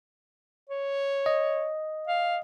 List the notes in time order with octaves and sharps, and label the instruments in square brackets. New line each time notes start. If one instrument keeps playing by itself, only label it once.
[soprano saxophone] C#5
[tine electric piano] D#5
[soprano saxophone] F5